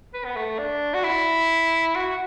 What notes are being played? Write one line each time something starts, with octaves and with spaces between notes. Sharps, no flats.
B4
B3
A3
D4
F#4
E4
F#4